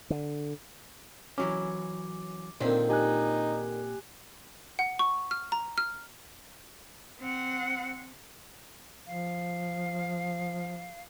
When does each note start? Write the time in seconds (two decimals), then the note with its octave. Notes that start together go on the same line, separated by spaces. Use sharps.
0.10 D3
1.38 E3 F#3 C#4 D6
2.61 A#2 D3 D#3 C4
2.89 D#4 G4 G#5 F#6
4.79 F#5
4.99 C#6
5.31 F6
5.52 A#5
5.78 F6
7.20 C4 F#5
9.07 F3 F5